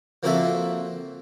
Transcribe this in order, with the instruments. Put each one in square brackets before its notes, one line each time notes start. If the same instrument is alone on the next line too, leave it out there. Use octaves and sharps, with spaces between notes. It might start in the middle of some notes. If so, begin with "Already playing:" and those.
[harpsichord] F3 A#3 C4 F#4 A4 E5